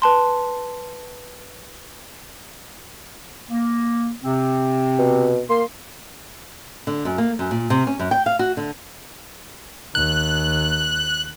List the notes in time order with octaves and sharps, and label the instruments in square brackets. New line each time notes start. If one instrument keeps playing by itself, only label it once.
[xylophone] B4 A5 C6
[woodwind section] A#3
C3 C4
[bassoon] B2
[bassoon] A#3 [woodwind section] C6
[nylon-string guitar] D3
F#2
A#3
F#2
A#2
C3
C#4
F#2
G5
F5
F#4
D3
[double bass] D#2 [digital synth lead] F#6